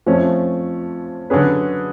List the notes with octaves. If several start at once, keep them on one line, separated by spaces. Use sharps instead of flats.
F2 F3 A3 C#4
D3 F#3 C#4 G#4 B4